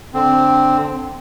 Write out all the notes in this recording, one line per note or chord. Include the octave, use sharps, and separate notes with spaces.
D3 C4